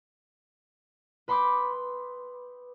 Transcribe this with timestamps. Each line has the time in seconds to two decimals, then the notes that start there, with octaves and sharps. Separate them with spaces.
1.28 B4 B5 C6 D6 D#6 G6